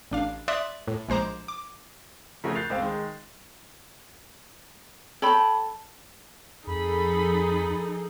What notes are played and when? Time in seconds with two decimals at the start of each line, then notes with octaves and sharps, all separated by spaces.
0.12 A1 D4 F5
0.48 D5 E5 C6 D#6 F#6
0.88 A2
1.09 A#1 G#3 C5 A#5 D6
1.48 D6
2.44 C#3 F3 A3 F#4 A#4 C#5
2.55 F#6 G6 A6 C7 F7
2.70 C#2 C4 F5
2.82 D#3 G#3
5.22 A4 C#5 G5 A5 B5
6.67 F2 F3 D#4 G#4 A4 B5